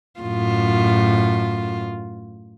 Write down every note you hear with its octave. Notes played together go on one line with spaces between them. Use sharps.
F#2 A2 F4